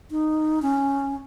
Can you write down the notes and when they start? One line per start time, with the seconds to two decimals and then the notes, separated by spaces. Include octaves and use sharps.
0.11 D#4
0.62 C#4